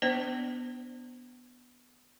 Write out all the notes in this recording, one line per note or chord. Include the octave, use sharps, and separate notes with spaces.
B3 D4 C5 D5